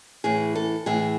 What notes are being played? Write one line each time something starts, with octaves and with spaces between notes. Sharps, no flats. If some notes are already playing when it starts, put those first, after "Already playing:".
A2 E3 G#4
A4
A2 E3 G#4